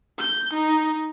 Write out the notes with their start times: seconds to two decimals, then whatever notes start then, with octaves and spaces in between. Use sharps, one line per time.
0.18 G6
0.53 D#4